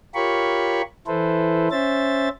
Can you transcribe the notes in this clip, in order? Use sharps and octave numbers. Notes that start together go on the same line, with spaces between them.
F4 G4 A#4 C#5 B5 C#6
E3 E4 A4 B4 C5
C#4 C5 E5 A6